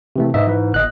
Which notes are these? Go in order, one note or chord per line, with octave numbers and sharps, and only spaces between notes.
C3 E3 A3
G#2 B4 D#5 E5
E3 E4 B4
G1 D#5 F#6